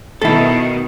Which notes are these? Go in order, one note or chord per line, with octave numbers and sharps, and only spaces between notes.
B2 D#3 E4 A4